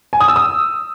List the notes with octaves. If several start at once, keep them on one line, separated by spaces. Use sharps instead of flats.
G#5
D#6
E6
D#6